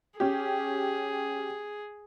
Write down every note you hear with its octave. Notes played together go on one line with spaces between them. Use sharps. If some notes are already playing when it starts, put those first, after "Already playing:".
C#4 G4 G#4